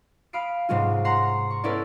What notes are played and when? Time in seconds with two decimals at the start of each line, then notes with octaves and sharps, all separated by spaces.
0.33 F5 B5 D#6 C7 D7
0.69 G#2 C3 G#3 C#4 F4
1.05 F#5 A#5 C6 C7
1.51 C#6
1.64 B3 C#4 E4 A4 A#4 D5